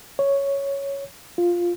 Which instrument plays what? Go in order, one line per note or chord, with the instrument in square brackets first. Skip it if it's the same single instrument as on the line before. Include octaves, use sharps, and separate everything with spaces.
[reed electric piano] C#5
F4